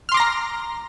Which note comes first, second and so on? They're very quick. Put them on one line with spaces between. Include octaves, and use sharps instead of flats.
F6 C6 D6 A#6 A#5